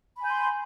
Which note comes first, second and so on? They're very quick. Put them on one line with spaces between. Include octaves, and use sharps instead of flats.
B5 G#5 G6 C6